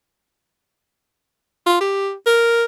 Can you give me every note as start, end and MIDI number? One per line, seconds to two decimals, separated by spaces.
1.66 1.79 65
1.81 2.12 67
2.26 2.65 70